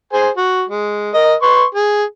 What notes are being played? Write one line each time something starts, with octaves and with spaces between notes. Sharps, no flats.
G#4 C5 G#5
F#4
G#3
A#4 D#5
B4 C6 C#6
G#4